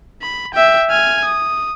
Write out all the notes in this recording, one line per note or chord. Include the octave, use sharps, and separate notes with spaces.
B5
E5 G5
G#5 F6
D#6